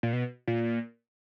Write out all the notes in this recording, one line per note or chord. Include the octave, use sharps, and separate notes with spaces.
A#2
B2
A#2